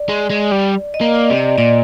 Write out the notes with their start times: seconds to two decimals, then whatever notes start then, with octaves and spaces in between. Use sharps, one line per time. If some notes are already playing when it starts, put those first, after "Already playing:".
Already playing: D5
0.09 G#3
0.30 G#3
0.52 G3
0.94 D#5
1.01 A#3
1.15 D5
1.30 C3
1.37 D5
1.58 A#2 D5